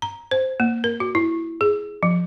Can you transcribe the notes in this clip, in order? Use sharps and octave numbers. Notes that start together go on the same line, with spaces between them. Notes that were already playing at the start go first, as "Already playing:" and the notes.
A#5
C5
A#3
A#4
F#4
E4
G#4
F3